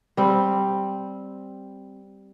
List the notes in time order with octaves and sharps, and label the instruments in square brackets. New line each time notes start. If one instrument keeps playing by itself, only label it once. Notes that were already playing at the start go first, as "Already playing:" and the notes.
[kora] G3 C4